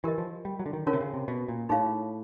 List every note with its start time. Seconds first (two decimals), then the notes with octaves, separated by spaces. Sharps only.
0.04 E3 G4 A#4 D#5
0.18 F3
0.45 G3
0.59 F#3
0.66 D3
0.73 D#3
0.86 D3 C#4 F4 A#4 C#5
0.93 C3
1.01 C#3
1.14 C3
1.28 B2
1.48 A#2
1.69 A2 D#4 G#4 C#5 F5